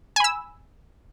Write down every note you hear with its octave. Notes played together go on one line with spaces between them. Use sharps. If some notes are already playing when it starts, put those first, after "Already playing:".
G#5 B5 E6